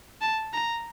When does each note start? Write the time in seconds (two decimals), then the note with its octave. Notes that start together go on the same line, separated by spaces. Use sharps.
0.21 A5
0.53 A#5